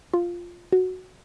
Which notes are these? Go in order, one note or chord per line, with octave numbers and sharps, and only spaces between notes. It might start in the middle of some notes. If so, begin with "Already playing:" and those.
F4
F#4